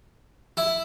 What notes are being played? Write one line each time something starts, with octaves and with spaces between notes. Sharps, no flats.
E4